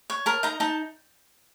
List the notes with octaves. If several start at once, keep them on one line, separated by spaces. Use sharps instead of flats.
C#5
A#4 A5
D#4 A#5
D#4 A5